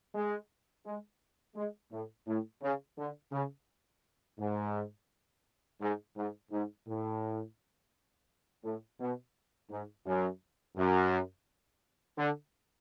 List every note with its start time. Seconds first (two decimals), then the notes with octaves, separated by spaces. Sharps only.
0.14 G#3
0.85 G#3
1.55 G#3
1.91 A2
2.27 A2
2.62 C#3
2.97 D3
3.32 C#3
4.39 G#2
5.80 G#2
6.16 G#2
6.51 G#2
6.87 A2
8.63 A2
9.00 B2
9.70 G#2
10.05 F#2
10.76 F#2
12.18 D3